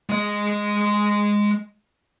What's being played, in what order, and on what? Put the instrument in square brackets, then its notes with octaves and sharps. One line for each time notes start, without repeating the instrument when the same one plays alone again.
[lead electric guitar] G#3 D#5